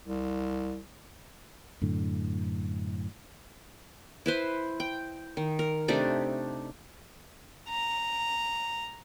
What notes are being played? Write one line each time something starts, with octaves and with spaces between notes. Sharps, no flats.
C2
F#2 A2 D3
E4 B4 C5
G5
D#3
A#4
C3 A3 D4 D#4
A#5